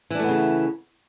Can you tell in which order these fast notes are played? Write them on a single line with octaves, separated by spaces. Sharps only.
E3 D4 A3 B3 C#3